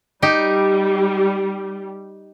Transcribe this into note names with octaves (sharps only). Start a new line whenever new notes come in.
G3 D#4 G4